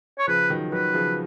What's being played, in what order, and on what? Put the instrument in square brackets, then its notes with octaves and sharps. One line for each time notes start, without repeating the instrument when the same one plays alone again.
[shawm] C#5
[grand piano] C#3 F3 [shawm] B4
[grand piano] D#3 F#3
[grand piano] D#3 F#3 [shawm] B4
[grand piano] C#3 F3